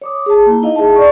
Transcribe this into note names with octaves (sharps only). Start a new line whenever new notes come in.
C#5 D6 D#6
G#4 A5
A#3 E4
D#4 E4 D#5 F5
G#4 E5 A5
D5 C#6